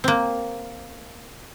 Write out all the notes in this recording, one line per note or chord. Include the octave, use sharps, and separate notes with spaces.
A#3 C4